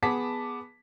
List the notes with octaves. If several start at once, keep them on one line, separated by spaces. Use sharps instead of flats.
B3 G#4 A5 D6 B6